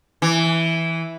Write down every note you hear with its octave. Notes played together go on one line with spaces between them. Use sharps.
E3